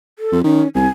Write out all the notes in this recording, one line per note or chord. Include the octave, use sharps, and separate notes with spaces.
A4
F2
D#3 C#4
C2 G#5